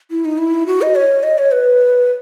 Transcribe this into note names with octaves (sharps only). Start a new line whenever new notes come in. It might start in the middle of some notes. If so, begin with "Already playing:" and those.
E4
D#4
E4
F#4
D#5
C#5
D#5
C#5
B4